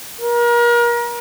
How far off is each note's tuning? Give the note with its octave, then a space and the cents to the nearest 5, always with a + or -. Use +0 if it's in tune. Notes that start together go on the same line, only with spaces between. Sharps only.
A#4 +35